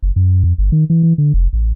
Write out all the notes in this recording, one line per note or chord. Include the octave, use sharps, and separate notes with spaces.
F#1
F#2
F2
G1
D#3
E3
E3
D3
F1
A1